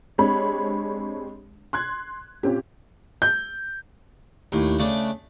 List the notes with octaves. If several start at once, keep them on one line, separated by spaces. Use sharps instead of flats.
G#3 C4 D4 G4 C#5 B5
C6 F#6 G#6
A#2 C4 C#4 G4
G6
D#2 A2
C#3 A3 D4